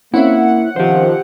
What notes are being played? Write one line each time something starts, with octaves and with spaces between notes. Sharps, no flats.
A#3 C4 C#4 E4 E5 F#5
D#3 F3 G4 C5